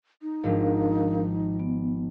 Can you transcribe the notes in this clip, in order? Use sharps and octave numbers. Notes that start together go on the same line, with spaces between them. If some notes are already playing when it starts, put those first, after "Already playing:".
D#4
G#1 G#2 F3 D4 A#4 F5
B3